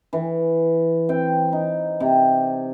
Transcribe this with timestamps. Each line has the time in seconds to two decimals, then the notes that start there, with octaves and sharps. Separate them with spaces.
0.13 E3
1.09 C4 G5
1.53 D#4
2.00 C3